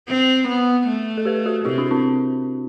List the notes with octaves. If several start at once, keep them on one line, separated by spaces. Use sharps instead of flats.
C4
B3
A3
A4
G4 B4
F#4 A4
C3 E4 G4
D4 F#4
C4 E4